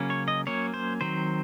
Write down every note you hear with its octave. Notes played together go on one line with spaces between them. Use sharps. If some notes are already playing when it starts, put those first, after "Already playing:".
Already playing: C#3 F#3 A#3 C#4
C#5
D#5
F#3 A#3 C#4 C#5
C5
D#3 F#3 C4 C5